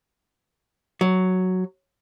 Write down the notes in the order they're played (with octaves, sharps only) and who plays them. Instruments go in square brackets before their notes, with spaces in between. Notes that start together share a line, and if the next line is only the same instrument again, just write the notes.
[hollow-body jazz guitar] F#3